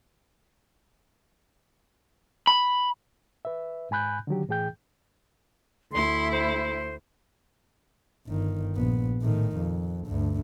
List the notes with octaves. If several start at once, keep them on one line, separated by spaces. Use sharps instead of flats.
B5
B4 E5
G#2 G#5 B5 F#6 G6
D3 D#3 F#3 G4
A2 E3 G#4 G5 G6
D2 E4 C6
C5
G1 D#3
A#1 B3
A2 D#3
F2
D2 G2